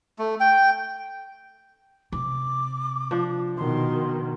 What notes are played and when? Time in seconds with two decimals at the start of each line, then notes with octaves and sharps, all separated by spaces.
0.19 A3
0.40 G5
2.12 C3 D6
3.11 F3 D4
3.57 B2 D#3 C6